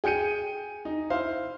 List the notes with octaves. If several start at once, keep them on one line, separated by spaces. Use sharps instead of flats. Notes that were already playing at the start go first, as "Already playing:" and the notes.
G#4 G5 G6 C#7 D#7
D#4
E4 C5 F5